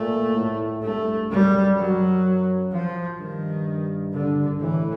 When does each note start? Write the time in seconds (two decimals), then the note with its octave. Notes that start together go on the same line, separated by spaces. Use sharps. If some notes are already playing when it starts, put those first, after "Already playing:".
Already playing: A#2 A3
0.36 A2
0.83 G2 A3
1.31 F#2 G3
1.77 F#2 F#3
2.72 F3
3.19 G2 D#3
4.13 D3
4.60 A2 E3